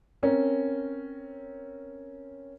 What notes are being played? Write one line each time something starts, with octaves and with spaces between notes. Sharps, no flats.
C4 C#4 A#4